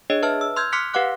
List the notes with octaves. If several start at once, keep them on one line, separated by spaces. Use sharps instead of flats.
D4 G#4 C#5 D#5
B4 E5 A5 F6
E6
C6 E6 F6 G6 G#6
C6 D6 F6 F#6 B6 C#7
G4 B4 F5 F#5 D6 F#6